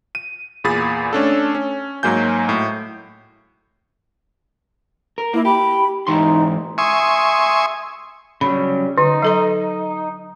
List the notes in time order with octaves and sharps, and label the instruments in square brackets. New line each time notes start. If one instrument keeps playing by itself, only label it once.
[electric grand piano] D#7
E2 A#2 G#4 B5 A6
A3 C#4 D4 A4
C#4
G#2 F#3 A#3 G#5 G6
A2
[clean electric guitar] A#4
[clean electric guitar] A#3 [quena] E4
[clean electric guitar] G4 [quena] B5
[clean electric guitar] G#2 E3 C6 [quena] D#4
[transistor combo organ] E5 G#5 C6 C#6 D#6
[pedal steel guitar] C#3 F#3 G3 [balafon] B5
[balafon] D3 [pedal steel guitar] D#4
[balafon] F#3 A4 A#5